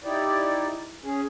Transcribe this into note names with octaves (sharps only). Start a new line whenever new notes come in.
D#4 E4 G4 D5
C#4 G#4